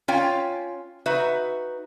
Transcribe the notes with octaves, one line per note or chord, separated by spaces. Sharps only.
C#4 F4 C#5 F5 G5
D#4 F#4 B4 E5